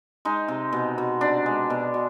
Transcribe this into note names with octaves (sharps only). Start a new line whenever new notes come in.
G#3 D#4
C3
B2
B2
C3 D4
G#3
B2
B2